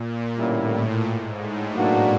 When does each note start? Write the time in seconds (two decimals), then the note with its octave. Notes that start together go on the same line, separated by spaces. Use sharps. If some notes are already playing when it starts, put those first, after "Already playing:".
Already playing: A#2
0.37 A2 D3 G3 A#3 C#4 E4
0.71 A#2
1.05 G#2
1.38 A2
1.72 B2 F#3 A#3 D4 F#4